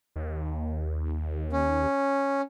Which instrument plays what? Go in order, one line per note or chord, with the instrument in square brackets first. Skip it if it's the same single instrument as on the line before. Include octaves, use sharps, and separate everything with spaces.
[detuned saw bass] D#2
[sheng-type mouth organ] C#4